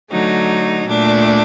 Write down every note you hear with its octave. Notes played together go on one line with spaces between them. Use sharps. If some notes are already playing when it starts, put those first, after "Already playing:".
D3 F#3 A3 D#4
A#2 A3 D4